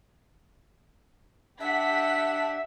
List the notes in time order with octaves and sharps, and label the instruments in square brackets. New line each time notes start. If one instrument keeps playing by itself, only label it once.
[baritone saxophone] D4 [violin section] G4 F#5 B6 [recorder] E5